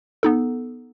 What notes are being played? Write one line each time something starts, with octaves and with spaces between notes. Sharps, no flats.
B3 D#4 A4